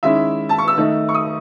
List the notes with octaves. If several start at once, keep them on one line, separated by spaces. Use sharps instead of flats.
D#3 G#3 C#4 E4 E5
A5
C#6
E6
D#3 A3 D#4
C#6
D#6